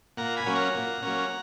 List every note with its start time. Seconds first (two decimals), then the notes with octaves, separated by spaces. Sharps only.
0.17 A#2 F#5 A#5
0.37 G#5 B5
0.46 F#3 A#3 C#4
0.55 F#5 A#5
0.75 A#2
1.02 F#3 A#3 C#4